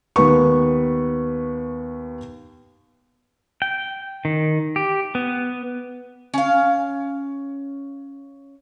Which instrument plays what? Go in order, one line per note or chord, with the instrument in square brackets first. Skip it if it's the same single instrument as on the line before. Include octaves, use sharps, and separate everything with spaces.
[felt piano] D#2 B3 B4 C#6
[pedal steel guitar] G5
D#3
G4
B3
[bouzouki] C#4 F5